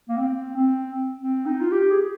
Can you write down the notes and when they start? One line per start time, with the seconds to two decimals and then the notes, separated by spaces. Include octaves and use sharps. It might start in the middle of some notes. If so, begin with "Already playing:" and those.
0.09 A#3
0.17 C4
0.57 C4
1.21 C4
1.46 D#4
1.61 F4
1.72 G4
1.91 G#4